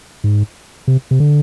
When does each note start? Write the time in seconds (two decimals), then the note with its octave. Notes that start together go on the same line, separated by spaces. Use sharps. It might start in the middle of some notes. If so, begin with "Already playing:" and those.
0.24 G#2
0.88 C3
1.11 C3
1.20 D3